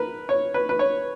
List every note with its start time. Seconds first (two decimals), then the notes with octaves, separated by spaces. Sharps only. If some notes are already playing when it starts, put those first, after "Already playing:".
Already playing: A#4 B4
0.29 C#5
0.54 B4
0.69 B4
0.79 C#5